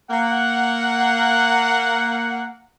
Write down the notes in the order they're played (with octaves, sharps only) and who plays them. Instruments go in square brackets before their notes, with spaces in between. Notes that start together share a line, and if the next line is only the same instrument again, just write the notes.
[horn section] A#3 F#5